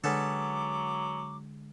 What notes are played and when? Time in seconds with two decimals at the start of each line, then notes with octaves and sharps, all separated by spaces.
0.04 D3 F#3 G#3 B3 C#4 A4 D6